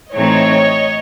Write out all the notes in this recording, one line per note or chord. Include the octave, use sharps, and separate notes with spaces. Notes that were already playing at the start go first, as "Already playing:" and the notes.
A2 E3 A3 C4 D#4 C#5 D#5